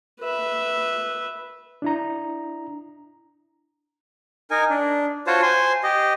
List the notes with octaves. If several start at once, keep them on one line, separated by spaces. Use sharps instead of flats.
B4 E5
D4 E4 A#5
D#4 A#4 G#5
D4
F4 F#4 C5 C#5 A5
C5 G#5 C6
G4 D#5